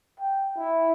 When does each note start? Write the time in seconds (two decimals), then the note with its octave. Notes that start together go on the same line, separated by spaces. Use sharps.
0.20 G5
0.57 E4